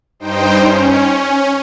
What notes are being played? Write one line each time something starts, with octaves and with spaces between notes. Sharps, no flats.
G2 D#4 C5 G5
C#4